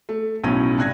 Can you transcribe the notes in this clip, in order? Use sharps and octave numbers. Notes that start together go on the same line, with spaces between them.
A3
B1 A2 F#3 C#4 D#7
G2 C3 F#6 G#6 A#6